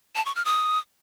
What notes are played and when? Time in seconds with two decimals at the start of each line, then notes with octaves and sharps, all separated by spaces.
0.16 A5
0.26 C#6
0.35 F6
0.45 D#6